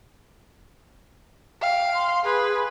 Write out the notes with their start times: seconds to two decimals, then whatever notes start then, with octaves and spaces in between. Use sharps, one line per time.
1.62 F5 G5
1.94 C6
2.24 G#4 B4